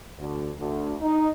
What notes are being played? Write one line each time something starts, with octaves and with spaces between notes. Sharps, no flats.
D2
D2
D#4